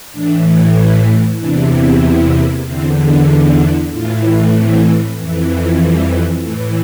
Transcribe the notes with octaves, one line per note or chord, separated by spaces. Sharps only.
A2 E3 D4
E4
E2 C3 E3 D4
C4
A#3
E2 D3 C4
D4
E4
A2 E3 F4
C4
F2 E3
G3
A2 E3 A3